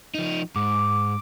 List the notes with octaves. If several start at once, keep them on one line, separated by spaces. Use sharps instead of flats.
F3 D#4
G#2 D6